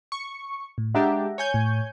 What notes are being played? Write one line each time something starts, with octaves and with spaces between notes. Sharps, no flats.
C#6
A2
G#3 D4 G4 E5 F#5 A#5
C#5 G#5 G6
A2